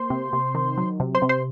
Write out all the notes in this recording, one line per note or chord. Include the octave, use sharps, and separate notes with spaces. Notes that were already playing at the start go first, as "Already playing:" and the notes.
Already playing: A#3 C5 C6
C3
C3
D#3
F#3
C3
C5 C6
C3
C5 C6